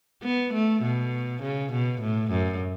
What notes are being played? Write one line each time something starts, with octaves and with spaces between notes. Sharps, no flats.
B3
A3
B2
C#3
B2
A2
F#2